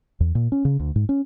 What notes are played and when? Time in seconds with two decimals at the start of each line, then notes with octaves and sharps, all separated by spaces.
0.20 E2
0.35 A#2
0.52 C#4
0.65 C#3
0.80 D2
0.96 G#2
1.09 C#4